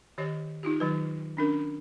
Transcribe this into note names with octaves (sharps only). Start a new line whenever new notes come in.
D#3 G4 C#5 D#5
D#4 F4 G4
D#3 F#3 B4
C#4 D4 A#4